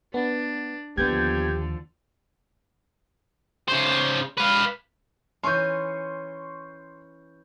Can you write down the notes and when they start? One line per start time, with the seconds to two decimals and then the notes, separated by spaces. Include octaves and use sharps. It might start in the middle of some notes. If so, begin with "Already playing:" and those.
0.14 B3 D4
0.97 D#2 D3 F3 B3 G4 G6 G#6
3.68 C#3 C5
4.38 B4 F5
5.43 E3 C#4 C6 C#6 G6